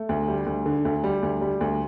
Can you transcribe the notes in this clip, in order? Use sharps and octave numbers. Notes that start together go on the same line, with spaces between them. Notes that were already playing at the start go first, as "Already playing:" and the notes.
Already playing: A3
D2
G3
D2
D3
D2
G3
D2
G3
D2